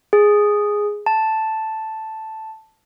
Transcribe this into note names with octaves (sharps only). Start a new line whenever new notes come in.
G#4
A5